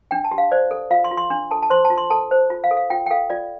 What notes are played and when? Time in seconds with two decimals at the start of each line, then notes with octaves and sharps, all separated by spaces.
0.11 D4 G5
0.24 A5
0.31 G4
0.38 F5
0.52 C5 D5
0.71 A4
0.91 F4 F5
1.04 C6
1.11 F4
1.17 C6
1.30 D4 C6
1.51 A4 A5
1.63 A5
1.70 C5 C6
1.85 A5
1.90 F4
1.98 C6
2.10 A4 A5
2.31 C5
2.50 F4
2.64 F5
2.71 A4
2.77 F5
2.90 F4 G5
3.06 G5
3.11 A4 F5
3.30 F4 D5